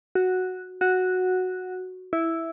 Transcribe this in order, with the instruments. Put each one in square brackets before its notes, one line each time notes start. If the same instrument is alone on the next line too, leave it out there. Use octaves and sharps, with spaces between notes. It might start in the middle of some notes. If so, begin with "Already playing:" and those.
[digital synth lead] F#4
F#4
E4